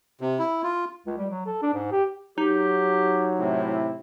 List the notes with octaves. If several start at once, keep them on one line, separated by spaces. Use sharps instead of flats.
C3
E4
F4
C#2
G3
F#3
A4
D4
G#2
G4
F#3 D#4 G4
A2 C3 E4